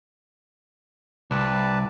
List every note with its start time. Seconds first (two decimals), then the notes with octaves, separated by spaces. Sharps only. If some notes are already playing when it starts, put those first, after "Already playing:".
1.31 C2 B4 D5 A5